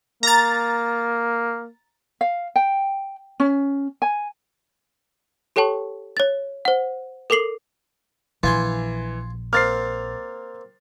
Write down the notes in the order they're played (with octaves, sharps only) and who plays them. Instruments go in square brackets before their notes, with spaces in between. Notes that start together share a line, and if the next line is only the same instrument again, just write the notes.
[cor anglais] A#3 [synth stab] A#5 A6
[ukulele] F5
G5
C#4
G#5
[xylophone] G4 A4 C#5 G5 A5 C#6
C#5 A6
C5 F#5
A4 A#4 D6 C7 F#7
[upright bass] A#1 [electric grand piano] E3 [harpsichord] F4 G#5 C6
[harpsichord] A#3 C4 [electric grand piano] F6 A6 C7